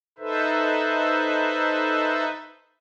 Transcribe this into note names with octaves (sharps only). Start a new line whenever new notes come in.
D#4 A4 B4 C5 E5